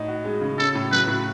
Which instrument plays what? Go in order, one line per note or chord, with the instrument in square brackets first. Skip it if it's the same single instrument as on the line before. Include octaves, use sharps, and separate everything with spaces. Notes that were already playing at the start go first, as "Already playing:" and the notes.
Already playing: [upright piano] A2 D#4
F#4
G#3
C#3
[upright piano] C#4 [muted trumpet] A4
[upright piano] A2
[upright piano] F#3 [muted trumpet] B4
[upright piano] A2